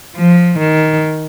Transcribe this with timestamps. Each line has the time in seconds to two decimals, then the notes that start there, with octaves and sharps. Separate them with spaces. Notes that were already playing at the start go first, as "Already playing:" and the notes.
0.16 F3
0.59 D#3